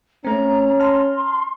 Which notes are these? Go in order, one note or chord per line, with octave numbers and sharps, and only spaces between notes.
A3 C4 C#4 A#5
A5 A#5 C6 F6